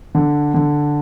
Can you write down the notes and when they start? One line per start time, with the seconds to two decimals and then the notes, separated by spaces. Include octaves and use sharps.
0.15 D3
0.54 D3